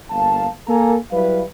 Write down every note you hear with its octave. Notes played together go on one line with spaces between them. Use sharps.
G1 A#3 F5 A5
A#3 A4 A#4 F5 G#5 A#5
F#3 G3 E4 B4 F5